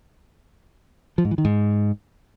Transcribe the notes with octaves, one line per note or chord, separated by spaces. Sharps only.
F3
G#2
E3
D#3
G#2